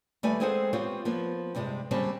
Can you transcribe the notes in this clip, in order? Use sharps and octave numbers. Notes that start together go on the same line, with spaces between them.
D#2 G3 A3 B4 D5 G#5
G#3 C4 G#4 A4 C5 F#5
B3 C4 F4 G4 C#5
F3 A#3 B3
G2 C3 G3 G#3
D#2 C#3 G3 A#3 C4 A5